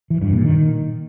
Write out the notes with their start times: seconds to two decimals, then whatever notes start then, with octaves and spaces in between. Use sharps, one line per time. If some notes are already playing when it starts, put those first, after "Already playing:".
0.10 E3
0.22 G2
0.33 A#2
0.44 D#3